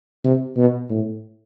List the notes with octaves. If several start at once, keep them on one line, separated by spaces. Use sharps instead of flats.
C3
B2
A2